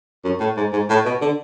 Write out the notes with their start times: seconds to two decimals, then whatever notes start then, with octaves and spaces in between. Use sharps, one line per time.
0.25 F#2
0.40 A2
0.57 G#2
0.73 G#2
0.89 A2
1.05 B2
1.21 D3